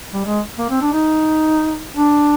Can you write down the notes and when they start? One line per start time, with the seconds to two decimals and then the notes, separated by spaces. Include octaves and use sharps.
0.13 G3
0.25 G#3
0.58 A#3
0.70 C4
0.81 D4
0.92 D#4
1.94 D4